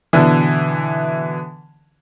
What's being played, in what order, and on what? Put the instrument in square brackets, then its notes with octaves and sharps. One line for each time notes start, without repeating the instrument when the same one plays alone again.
[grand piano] B2 D3 E3